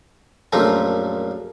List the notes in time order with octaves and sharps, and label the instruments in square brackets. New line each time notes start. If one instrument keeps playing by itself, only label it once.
[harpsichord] A#1 F#2 F3 A3 D#4